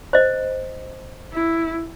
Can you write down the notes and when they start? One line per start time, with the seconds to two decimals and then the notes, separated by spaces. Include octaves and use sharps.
0.13 C5 D#5
1.33 E4